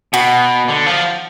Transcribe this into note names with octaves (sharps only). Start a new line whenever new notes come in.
B2 F#4
D3
F3